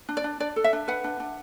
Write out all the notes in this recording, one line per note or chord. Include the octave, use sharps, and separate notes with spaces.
D4
D5
D4
D4 D5
A4
E5
D4
B4 F#5
D4
D4